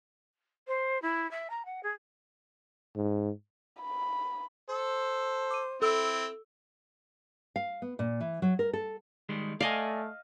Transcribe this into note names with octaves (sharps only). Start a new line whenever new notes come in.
C5
E4
E5
A#5
F#5
G#4
G#2
B5
A4 C5
D6 D#7
C4 E4 A4 E6
F5
B3
A#2
E3
F#3
A#4
A4
D#3 G3 G#3
A3 D5 D#5 F5 G#5